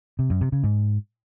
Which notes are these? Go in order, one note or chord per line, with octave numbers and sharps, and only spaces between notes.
C3
F#2
C3
C#3
G#2